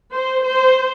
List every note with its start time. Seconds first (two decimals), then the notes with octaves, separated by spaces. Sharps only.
0.12 C5
0.44 C5